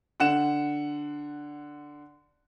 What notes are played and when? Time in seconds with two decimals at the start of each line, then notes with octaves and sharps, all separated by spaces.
0.20 D3 F#5 E7